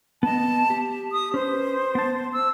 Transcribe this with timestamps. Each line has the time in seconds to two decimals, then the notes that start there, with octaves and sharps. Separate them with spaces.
0.23 B3 D#5 A5
0.70 G4
1.12 D#6
1.34 C#4 B4 C5
1.95 B3 A5
2.33 E6